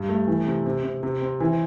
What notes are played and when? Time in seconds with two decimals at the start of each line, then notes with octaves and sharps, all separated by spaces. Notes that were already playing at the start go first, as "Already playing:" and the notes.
Already playing: G2
0.09 A3
0.27 E3
0.47 C3
0.66 C3
0.84 C3
1.03 C3
1.22 C4
1.40 E3